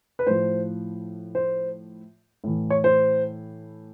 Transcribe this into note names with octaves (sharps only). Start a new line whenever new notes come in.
B4
A2 F3 C5
C5
A2 E3
C#5
C5